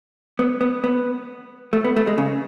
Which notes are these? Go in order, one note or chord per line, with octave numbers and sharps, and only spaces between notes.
B3
B3
B3
A3
B3
A3
G#3
C#3